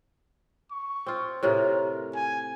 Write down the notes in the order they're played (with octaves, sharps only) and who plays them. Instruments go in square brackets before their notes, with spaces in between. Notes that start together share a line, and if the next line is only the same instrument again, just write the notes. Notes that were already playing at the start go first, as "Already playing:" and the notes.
[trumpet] C#6
[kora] C4 F4
[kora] A2 C3 F4 [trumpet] A#4
[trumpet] G#5